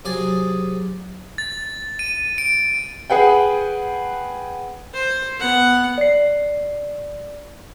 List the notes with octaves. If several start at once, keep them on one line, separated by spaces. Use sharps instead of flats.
C3 F#3 G#4 G#5 A5
A6
D#7
D7
G#4 B4 F#5 G5
C5
B3 F#5
D5 C7